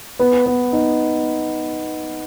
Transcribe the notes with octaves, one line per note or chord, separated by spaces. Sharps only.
B3
B3
D#4